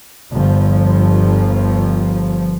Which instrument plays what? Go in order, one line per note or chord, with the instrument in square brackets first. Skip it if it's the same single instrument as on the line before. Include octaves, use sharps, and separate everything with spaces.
[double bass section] G1 F3